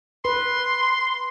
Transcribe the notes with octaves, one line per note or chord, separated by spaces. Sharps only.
B4 C6